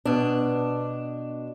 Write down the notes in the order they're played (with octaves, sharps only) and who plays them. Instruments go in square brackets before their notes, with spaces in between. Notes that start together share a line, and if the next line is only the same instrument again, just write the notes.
[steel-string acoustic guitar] B2 D4